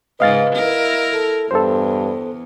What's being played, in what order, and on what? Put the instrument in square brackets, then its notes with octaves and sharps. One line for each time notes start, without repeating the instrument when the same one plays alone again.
[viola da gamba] G#2 C#3 [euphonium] B4 [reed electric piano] D#5 F5 A6
[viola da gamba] E4 A#4
[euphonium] A4
[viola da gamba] E2 [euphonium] G2 [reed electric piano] A4 C5